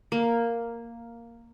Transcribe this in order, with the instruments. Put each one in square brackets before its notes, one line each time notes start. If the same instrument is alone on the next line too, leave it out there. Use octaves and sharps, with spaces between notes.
[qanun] A#3